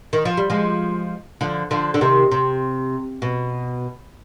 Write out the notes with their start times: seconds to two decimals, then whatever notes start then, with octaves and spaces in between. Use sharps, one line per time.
0.13 D#3
0.25 F3
0.37 G3
0.50 F3 G#3
1.41 D3 F3
1.71 D3 F3
1.94 D3
2.01 C3 D#3
2.31 C3
3.22 B2